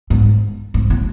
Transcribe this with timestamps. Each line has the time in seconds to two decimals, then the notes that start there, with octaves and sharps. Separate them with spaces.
0.10 G#2
0.74 G#2
0.90 A2